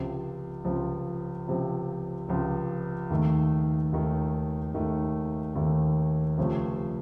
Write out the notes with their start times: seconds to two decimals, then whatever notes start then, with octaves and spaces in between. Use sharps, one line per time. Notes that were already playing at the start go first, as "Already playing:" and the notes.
Already playing: C#2 C3 F3
0.65 C#2 C3 F3
1.47 C#2 C3 F3
2.28 C#2 C3 F3
3.10 D#2 D#3 A3
3.93 D#2 D#3 A3
4.74 D#2 D#3 A3
5.55 D#2 D#3 A3
6.37 C#2 C3 F3 A3 C#4